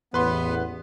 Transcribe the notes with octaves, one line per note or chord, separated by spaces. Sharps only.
A1 E2 B3 B4 C6